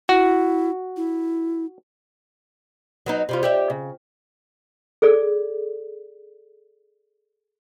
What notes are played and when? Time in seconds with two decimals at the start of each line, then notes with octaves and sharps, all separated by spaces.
0.09 E4 F#4
0.97 E4
3.06 F#3 B3 D#4
3.29 C3 G3 F4
3.43 G4 D5 E5
3.70 C#3
5.02 G#4 A4 D5